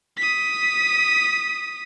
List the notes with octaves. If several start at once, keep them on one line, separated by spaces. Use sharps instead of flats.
D#6 B6